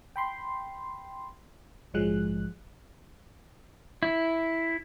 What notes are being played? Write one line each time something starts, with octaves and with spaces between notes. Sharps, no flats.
G5 B5 C6
A#1 G#2 F3 F#3 G#3 F#6
E4